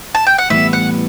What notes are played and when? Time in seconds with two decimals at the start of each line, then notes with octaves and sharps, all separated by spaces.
0.15 A5
0.27 G5
0.38 F#5
0.50 A2 E3 G3 B3 E5
0.73 F#5